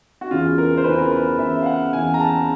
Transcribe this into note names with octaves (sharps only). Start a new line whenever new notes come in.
F#4
E2 C#3 E3 F4
A#4
C5
E2 C#3 E3 B4
A#4
B4
E2 C#3 E3 E5
F5
F#5
E2 C#3 E3 G#5
A#5
A5